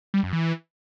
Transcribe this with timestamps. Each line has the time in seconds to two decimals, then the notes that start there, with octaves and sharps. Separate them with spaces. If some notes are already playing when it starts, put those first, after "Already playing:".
0.14 G3
0.23 F#2
0.33 E3